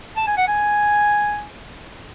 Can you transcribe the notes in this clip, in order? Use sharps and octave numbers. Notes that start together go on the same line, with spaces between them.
A5
G#5
F#5
G#5